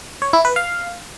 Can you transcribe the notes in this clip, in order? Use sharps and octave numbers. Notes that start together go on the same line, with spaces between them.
C#5
E4
B4
F5